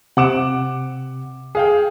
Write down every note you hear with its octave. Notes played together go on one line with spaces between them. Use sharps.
C3 F#5 D6 E7
G#4 F5 G5